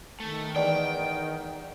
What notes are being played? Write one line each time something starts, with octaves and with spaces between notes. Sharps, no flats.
D#3 A3
E2 D5 G5